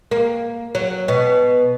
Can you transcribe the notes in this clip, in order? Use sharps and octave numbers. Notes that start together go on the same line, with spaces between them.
A#3
F#3
B2